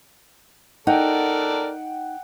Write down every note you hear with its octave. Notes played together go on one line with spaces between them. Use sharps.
D#4 A4 A#4 D5 F#5 G5